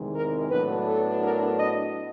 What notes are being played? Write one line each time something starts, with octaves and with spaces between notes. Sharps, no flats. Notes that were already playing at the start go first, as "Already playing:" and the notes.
Already playing: E2 C3 D#3 G#3
A#4
A2 F#3 B3 D4 B4
A4
A#4
D#5